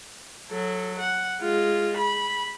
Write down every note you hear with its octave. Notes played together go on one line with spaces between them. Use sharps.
F#3 A4
F#5
G#3 F4
B5